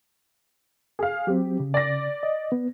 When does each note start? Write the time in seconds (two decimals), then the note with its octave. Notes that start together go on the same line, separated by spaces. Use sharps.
0.99 G#4 F5
1.27 F#3 C4 G4
1.60 C#3
1.74 D5 A#6
2.23 D#5
2.52 B3